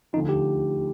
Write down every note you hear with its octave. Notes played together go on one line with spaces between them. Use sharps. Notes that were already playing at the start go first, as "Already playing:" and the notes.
D2 D3 F3 D#4
G4